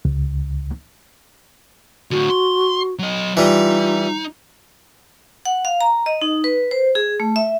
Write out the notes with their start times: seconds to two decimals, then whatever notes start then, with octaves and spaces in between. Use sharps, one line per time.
0.05 C#2
2.11 A2 D3 F#4
2.30 C6
2.99 F#3 D#5
3.37 E3 G3 D#4 F4
5.45 F#5
5.65 F5
5.81 A#5
6.06 D#5
6.22 D#4
6.44 B4
6.71 C5
6.95 G#4
7.20 A3
7.36 E5